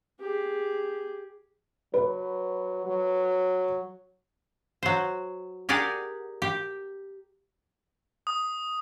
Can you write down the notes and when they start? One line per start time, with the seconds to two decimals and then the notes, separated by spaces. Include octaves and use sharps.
0.20 G4 G#4
1.94 F#3 B4
2.86 F#3
4.83 F#3 C5
5.69 G4 G#4 A#4 D5 F#5
6.42 G4
8.27 D#6